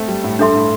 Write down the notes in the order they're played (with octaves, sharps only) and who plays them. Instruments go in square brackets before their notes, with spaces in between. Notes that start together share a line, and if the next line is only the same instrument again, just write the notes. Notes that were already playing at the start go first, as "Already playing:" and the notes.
Already playing: [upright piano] A3 C4
G3
A2
[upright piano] G2 [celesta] D4 A4 E5 C6
[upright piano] A2